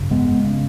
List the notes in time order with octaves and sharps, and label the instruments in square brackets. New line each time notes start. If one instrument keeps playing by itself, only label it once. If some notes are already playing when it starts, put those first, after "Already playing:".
Already playing: [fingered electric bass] G#1 F#2 C#3
G#3 B3
C#3